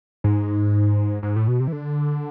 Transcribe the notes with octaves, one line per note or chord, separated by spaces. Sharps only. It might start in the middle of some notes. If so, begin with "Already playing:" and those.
G#2
G#2
A2
B2
C3
E3
D3